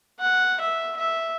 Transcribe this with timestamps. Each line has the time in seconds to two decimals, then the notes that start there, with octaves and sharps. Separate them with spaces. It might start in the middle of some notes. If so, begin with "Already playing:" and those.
0.20 F#5
0.61 E5
0.97 E5